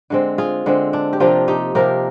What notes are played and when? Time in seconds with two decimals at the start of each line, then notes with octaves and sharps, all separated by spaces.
0.10 D3 G#3 C4
0.38 F4 G#4
0.66 D3 G#3 C4
0.93 D4
1.13 G4
1.20 C3 F3 A#3 D4 F4
1.48 D#4 G4
1.75 C3 F3 A#3 G4 A#4